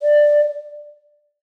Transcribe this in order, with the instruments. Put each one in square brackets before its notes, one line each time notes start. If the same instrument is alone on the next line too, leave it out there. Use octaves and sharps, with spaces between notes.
[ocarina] D5